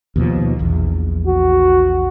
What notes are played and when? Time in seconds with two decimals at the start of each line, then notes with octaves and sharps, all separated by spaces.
0.16 D#2 B2 F3
0.59 A#1 E2
1.27 F#4